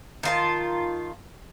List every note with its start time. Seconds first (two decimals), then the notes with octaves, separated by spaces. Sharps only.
0.23 D#3 F4 A5